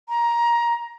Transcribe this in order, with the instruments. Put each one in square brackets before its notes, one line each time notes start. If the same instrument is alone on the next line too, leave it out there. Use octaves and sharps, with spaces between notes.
[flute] A#5